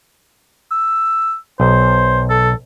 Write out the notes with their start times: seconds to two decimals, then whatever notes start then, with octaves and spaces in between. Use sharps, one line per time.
0.72 E6
1.60 B1 C5
2.30 A4